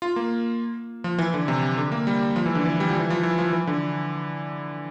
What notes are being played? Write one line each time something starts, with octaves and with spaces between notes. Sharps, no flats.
F4
A#3
F3
E3
D3
C3
D3
A#3
G3
F3
E3
D3
E3
G3
F3
E3
F3
E3
F3
E3
D3